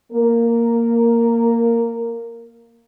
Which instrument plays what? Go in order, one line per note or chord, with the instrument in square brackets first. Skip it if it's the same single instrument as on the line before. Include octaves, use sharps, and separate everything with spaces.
[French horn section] A#3 A#4